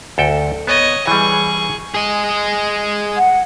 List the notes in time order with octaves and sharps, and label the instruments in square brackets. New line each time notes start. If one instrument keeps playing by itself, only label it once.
[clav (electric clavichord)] D2 A4 G5
[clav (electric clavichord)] B3 [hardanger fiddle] C#5 D#5
[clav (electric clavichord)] E3 G3 [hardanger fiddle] G#4 C#6
[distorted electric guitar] G#4 D#5
[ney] F#5